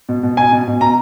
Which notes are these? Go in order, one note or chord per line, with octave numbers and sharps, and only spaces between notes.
B2
B2
B2 G#5
B2
B2
B2 A#5